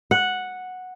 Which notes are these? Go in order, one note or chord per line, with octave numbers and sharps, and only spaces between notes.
F#5